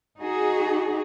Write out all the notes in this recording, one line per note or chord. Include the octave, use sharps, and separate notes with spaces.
D#4 F#4 G#4